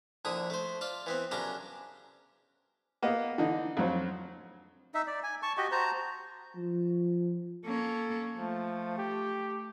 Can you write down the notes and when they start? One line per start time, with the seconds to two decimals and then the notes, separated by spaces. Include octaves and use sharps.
0.25 A#1 D3 E4 D#6
0.50 A3 C5
0.81 F4 D5
1.06 E3 B3 C4
1.31 F#2 C#3 D4 G4 A#5
3.03 A#3 B3 D#5
3.38 D3 E3 D#4
3.77 F2 F#3 C5
4.94 D#4 E5
5.07 D5
5.23 G#5
5.43 A5 C#6
5.57 F#4 G4 D#5
5.72 F#4 C5 A5 A#5
6.56 F3
7.65 A#3 C#4 A4
8.38 F3 A3
8.98 G4